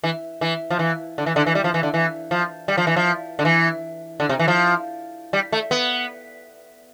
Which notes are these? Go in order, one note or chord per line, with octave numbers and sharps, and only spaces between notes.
E3
E3
F3
E3
D3
E3
D3
E3
G3
F3
E3
D3
E3
F3
G3
F3
E3
F3
D3
E3
D3
C3
E3
F3
G3
A3
B3